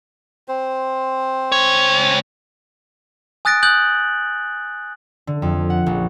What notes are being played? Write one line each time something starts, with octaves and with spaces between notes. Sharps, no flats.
C4 C5
C#2 C#5
G#5 D#6 F#6 A6 A#6 D7
D#6 F#6 G6 F#7
D3
F2
F#5
A#1